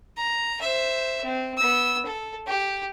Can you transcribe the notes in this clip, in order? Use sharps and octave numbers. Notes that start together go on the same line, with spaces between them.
A#5
C5 E5
C4
B3 E6
A4
G4